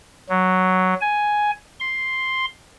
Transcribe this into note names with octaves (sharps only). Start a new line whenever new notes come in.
F#3
G#5
C6